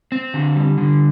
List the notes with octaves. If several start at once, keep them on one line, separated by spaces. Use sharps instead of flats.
C4
D3
G3
D3